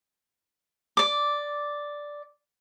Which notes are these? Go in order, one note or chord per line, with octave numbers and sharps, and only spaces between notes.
D5 D6